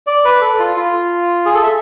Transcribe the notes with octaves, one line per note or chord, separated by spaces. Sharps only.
D5
B4
A4
F4
F4
G#4
A4
E5